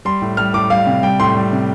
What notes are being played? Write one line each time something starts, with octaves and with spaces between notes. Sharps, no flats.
G3 C6
A2
G3 F6
A2 D6
G3 F5
C3
G3 G5
A2 C6
G3
C3